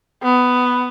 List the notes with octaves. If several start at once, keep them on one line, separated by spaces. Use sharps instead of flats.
B3